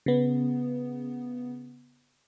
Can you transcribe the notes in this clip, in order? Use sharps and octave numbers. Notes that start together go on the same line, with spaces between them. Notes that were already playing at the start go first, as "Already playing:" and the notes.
C#3 B3